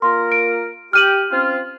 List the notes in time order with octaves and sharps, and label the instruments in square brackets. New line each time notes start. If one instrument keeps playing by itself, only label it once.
[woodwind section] A#3 F4 A#4 [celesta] C6
[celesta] D7
[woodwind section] G4 [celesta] F6 D#7 F#7
[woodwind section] C4 C#4 F4